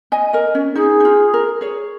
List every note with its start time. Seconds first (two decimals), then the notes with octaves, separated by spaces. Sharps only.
0.12 D#5 G#5
0.33 A#4 D#5
0.55 C#4
0.75 D#4 G#4
1.00 D#4
1.05 F4
1.34 A#4
1.61 G#4 C#5